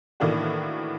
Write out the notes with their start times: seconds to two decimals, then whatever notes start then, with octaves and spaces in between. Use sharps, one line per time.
0.20 A2 D#3 E3 A#3 D4 F#4